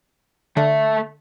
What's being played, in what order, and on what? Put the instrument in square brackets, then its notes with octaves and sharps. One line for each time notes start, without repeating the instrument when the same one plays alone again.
[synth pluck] D3 [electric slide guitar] A3 E5